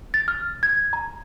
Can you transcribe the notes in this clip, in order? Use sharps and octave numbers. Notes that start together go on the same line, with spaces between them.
A6
F6
G#6
A#5